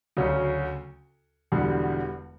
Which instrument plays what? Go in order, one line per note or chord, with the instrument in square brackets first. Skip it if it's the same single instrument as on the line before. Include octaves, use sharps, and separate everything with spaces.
[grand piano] D2 C#3 F#3 C#4
E1 E2 D3 G3